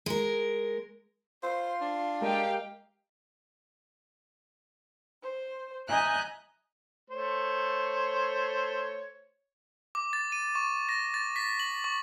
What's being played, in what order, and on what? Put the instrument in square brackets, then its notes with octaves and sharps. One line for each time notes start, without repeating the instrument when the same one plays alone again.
[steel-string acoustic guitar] G#3 A#4
[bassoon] F4 [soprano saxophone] C5 [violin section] C6
[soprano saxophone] D4
[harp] G#3 A#4 D#5 [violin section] G4 F5 G5
[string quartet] C5
D#5 E5 G#5 A#5 F#6 G6
[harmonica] A3 C5 C#5
[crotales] D6
A6
D#7
C#6
A#6
A6
B6
F#7
C#6